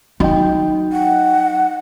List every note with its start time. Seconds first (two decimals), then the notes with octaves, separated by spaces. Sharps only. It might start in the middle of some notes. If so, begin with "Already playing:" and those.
0.20 F#3 D#4 D#5 G5
0.93 F#5